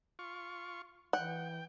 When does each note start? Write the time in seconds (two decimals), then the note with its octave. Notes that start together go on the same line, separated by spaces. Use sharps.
0.19 F4 C#6
1.13 E3 F#5 G5